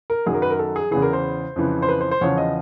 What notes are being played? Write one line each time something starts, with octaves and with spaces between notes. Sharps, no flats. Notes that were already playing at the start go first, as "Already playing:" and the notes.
A#4
F#2 D#3 F#3 G#4
A#4
B4
A#4
A4
G#4
E2 C#3 E3 G#4
A#4
C5
F2 C#3 E3
C5
B4
C5
C5
E2 C#3 F3 C#5
D#5